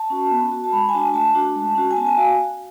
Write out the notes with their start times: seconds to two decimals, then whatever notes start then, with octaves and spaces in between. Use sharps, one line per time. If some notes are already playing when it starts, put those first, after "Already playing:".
Already playing: A5
0.10 C#4 F#4
0.31 B3
0.52 F#4
0.64 A5
0.72 G#3 B5
0.89 G#5
0.93 D4 F#4 A5
1.14 A3 A5
1.35 D4 F#4
1.55 G#3
1.75 C#4 F#4
1.91 G#5
1.97 B3 A5
2.07 G#5
2.18 F#4 F5